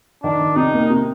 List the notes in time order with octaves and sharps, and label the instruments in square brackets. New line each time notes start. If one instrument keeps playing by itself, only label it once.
[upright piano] D#3 [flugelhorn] D4
[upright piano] D#3
[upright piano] C3 [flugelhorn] D#4
[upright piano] A#3
C3